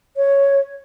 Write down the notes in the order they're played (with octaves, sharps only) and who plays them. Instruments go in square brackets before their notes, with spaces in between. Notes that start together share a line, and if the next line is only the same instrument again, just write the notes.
[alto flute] C#5